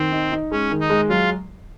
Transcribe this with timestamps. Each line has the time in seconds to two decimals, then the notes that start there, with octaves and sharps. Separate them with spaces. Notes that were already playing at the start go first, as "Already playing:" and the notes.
Already playing: D#3 C4
0.12 D#4
0.32 D#4
0.51 G#3 C#4
0.71 D#3
0.81 D#4
0.90 G#3
1.09 F#3 F4